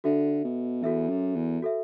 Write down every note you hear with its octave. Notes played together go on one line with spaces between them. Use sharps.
D3 F#4 A4 E5
B2
E2 F#4 A4 E5
F#2
E2
F#4 A4 E5